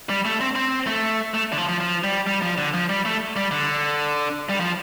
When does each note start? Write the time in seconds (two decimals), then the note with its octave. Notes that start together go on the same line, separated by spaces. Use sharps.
0.09 G3
0.25 A3
0.41 C4
0.56 C4
0.87 A3
1.34 A3
1.52 D3
1.57 F3
1.69 F3
1.80 F3
2.04 G3
2.27 G3
2.42 F3
2.58 D3
2.74 F3
2.89 G3
3.05 A3
3.36 G3
3.51 D3
4.49 G3
4.60 F3